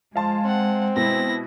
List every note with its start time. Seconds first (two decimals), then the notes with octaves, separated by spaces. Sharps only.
0.16 F3 G#3 F5 A5 C6
0.45 C4 F#5
0.96 B2 E4 A#6